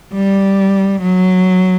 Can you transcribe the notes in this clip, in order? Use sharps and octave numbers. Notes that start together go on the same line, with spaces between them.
G3
F#3